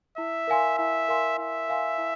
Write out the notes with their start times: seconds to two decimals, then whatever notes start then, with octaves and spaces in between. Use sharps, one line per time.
0.17 E4 E5
0.47 A#4 F5 G#5 C6
0.78 E4 E5
1.08 A#4 F5 G#5 C6
1.38 E4 E5
1.68 A#4 F5 G#5 C6
1.98 E4